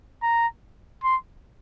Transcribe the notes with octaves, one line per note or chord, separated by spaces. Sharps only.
A#5
C6